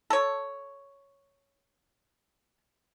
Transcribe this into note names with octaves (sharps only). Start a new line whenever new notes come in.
A4 C#5